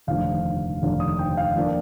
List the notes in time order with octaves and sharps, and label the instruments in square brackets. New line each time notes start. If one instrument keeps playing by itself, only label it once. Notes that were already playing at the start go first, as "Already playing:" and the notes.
[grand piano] F1 D#2 D3 F3 F5
F1 D#2 D3 F3
D#6
G5
F5
D3 F3 A#3 D4